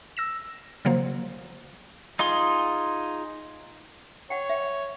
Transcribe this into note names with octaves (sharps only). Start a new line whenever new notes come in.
E6 A#6 E7
C#3 F3 F#3 A#3 C5
D#4 F4 G#4 C6
C#5 F#5 G5
E5